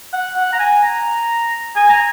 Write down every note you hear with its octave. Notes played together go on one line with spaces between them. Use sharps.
F#5
F#5
A#5
G#5
A#5
G#5
A#5